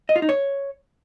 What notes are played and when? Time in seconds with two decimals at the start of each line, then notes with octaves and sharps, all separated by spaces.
0.09 D#5
0.16 F4
0.22 D#4
0.29 C#5